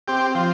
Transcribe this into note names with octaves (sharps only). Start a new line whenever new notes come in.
C4 G4
F3